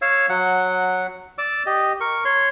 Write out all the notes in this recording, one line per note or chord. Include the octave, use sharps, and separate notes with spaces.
C#5 F5 E6
F#3 F#5
D5 D6 E6
G4 D#5
A#4 C#6
C#5 C6